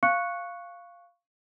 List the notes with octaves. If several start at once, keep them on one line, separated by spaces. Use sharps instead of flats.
F5 C#6 F#6 C#7